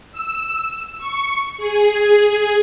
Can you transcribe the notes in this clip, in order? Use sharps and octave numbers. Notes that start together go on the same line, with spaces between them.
E6
C#6
G#4